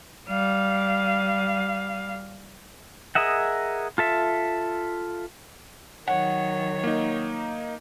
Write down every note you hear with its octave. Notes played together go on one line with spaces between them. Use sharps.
G3 F5
G#4 A#4 D#5 E5 F#5
F4 A4 E5
D#3 F#3 C#5 F#5
A#3 D#4